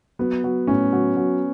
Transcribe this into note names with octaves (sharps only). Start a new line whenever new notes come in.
F#3 B3
F#3
A2 C#4
F#3
F#3